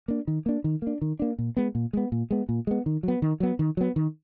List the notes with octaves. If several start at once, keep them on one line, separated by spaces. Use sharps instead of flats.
A#3 D4
D#3
A#3 D4
D#3
A#3 D4
D#3
A#3 D4
A#2
G#3 B3
A#2
G#3 B3
A#2
G#3 B3
A#2
G#3 B3
D#3
F#3 B3
D#3
F#3 B3
D#3
F#3 B3
D#3